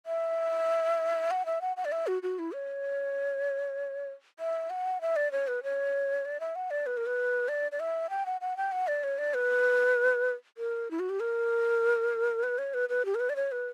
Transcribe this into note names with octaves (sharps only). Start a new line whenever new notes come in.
E5
F#5
E5
F#5
F#5
D5
E5
F#4
F#4
E4
C#5
E5
F#5
E5
D5
C#5
B4
C#5
D5
E5
F#5
D5
B4
A#4
B4
D5
D5
E5
G5
F#5
F#5
G5
F#5
D5
C#5
D5
B4
A#4
E4
F#4
G4
A#4
B4
C#5
B4
B4
G4
A#4
B4
D5
C#5
B4